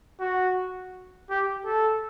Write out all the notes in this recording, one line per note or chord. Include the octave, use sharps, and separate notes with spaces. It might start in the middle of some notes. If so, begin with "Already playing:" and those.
F#4
G4
A4